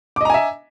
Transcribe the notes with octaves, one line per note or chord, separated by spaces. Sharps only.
D#5 E5 G#5 A#5 D6